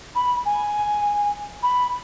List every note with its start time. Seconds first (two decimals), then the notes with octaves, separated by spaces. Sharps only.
0.15 B5
0.45 G#5
1.63 B5